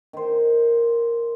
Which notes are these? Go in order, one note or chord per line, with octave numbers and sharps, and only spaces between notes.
D#3 C5